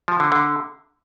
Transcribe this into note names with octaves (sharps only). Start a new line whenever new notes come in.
F3
D3
D3